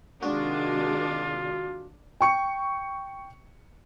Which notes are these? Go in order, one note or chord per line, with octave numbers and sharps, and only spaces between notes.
C3 D#3 G#3 D4 F4 F#4
G5 C#6 C#7